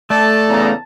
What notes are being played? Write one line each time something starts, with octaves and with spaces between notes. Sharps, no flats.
A3 A4 D5 A5
E2 C#3 A#5